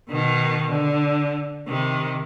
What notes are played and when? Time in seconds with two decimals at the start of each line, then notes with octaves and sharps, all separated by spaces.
0.10 B2 D#3
0.71 D3
1.68 C3 D#3